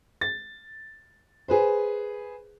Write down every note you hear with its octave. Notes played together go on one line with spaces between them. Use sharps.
A6
G#4 B4 C5